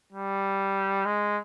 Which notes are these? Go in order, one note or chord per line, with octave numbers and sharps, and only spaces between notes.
G3
G#3